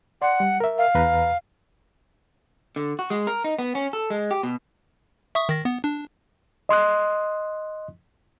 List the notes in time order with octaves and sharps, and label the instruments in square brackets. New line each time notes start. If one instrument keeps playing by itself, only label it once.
[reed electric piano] D5 C6 [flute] F#5
[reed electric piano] G3
A#4 E5
[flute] F5
[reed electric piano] E2 B4 A#5
[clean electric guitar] D3
F#4
G#3
A#4
D#4
B3
C#4
A4
G#3
G4
B2
[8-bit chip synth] E5 C#6 D#6
D#3 A#6
B3
D4
[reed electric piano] D#5 C6 D#6 F#6